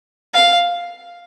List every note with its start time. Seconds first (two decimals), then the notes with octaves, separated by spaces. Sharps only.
0.34 F5